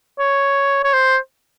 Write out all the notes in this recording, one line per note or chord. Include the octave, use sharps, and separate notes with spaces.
C#5
C#5
C5